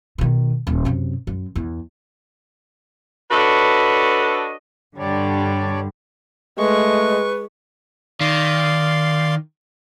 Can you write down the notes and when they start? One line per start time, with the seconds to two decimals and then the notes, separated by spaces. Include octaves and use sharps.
0.18 B2 D#3
0.67 D#1
0.85 F#2 C3
1.27 F#2
1.55 E2
3.31 D4 F#4 A4 B4 C#5 D#5
4.98 G2 D3 G3 D4 C#5 D5
6.58 G#3 A3 B4 C#6
8.21 D#3 D5 F5 C6